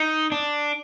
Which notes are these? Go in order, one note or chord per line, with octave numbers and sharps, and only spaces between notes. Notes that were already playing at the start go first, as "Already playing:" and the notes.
Already playing: D#4
D4